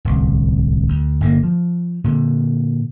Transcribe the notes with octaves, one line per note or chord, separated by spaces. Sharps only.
D1 C2
D2
G1 D3 D#3 A#3
F3
A#2 D3